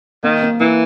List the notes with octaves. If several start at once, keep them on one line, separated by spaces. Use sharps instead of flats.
D#3 A#3
A#3
E3 A#3